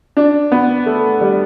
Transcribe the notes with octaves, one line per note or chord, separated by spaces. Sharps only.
D4
B3
A3
G3